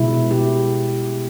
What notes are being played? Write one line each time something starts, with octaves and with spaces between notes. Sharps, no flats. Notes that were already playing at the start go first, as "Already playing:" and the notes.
Already playing: B2 G#3 E4
G4